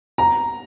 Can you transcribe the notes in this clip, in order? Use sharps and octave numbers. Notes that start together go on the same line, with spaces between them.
A#5